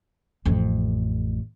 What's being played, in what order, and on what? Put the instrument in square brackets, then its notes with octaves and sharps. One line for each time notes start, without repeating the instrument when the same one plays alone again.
[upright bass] A1 F2